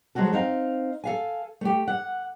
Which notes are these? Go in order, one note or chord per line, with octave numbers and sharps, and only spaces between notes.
F3 F#3 G#3 C#4 F#4 A4
C4 D#4 F5
A4 F5 G#5
A3 G4
F#5